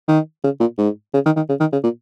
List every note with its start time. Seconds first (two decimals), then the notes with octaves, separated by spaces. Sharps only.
0.08 D#3
0.44 C#3
0.60 A#2
0.78 G#2
1.14 C#3
1.26 D#3
1.36 D#3
1.49 C#3
1.60 D#3
1.72 C#3
1.84 A#2